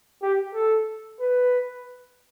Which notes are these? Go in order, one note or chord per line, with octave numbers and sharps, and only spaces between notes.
G4
A4
B4